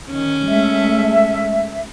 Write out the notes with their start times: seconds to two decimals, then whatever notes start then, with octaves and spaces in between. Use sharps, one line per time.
0.11 D#3 C#4
0.48 G#3 A3 E5